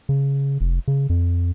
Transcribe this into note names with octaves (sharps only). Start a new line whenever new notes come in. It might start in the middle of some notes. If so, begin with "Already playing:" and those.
C#3
F1
C#3
F2